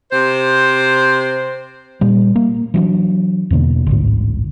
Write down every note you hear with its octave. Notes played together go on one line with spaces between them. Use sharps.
C3 C5
A#2 G3
A#3
E3 F#3 D4
E2 B2 D3 A#3
A1 D2 G#2